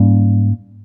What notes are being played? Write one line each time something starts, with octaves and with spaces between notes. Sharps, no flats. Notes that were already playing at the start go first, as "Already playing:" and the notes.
Already playing: G#2 G3 A#3 C#4